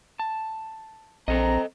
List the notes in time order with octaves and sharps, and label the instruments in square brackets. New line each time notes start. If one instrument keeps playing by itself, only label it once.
[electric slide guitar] A5
[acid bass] A#1 [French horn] C4 [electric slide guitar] A4 D#5 [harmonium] A#5